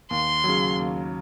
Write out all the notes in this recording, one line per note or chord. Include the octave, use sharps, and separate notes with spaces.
D#2 C6
C#3 F#3
D#2